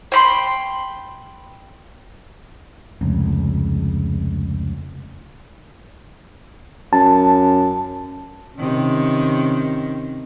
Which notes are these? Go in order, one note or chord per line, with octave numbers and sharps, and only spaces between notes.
G5 B5 C6
F1 C#2
F#2 A5
C3 D#3 C#4